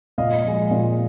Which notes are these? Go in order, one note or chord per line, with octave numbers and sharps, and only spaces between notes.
A#2 D#5 F5
F3 G#3
A#2